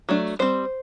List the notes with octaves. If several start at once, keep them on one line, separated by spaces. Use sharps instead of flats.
F#3 A3 D4
G3 C4 C5